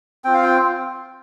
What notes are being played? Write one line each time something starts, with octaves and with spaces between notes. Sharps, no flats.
C4 F4 G5
F5
G5